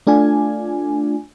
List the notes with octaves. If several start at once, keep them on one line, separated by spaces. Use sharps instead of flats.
A3 D4 F4 G#5